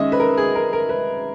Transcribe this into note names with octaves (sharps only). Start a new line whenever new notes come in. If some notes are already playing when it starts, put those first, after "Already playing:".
Already playing: D#3 G#3 C#4 D#5 E5
B4
A#4
G#4
A#4
A#4
B4